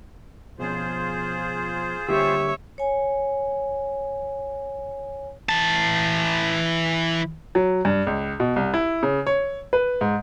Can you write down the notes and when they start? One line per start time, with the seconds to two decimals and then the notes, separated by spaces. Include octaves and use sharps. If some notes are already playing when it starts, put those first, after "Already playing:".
0.59 B2 F3 C#4 F4 G#4 C5
2.09 D3 G3 A#3 G4 C#5 E5
2.78 C#5 G#5
5.49 E3 A5
7.55 F#3
7.85 G2
8.07 C#2
8.40 B2
8.56 C2
8.74 E4
9.03 C#3
9.27 C#5
9.73 B4
10.01 G#2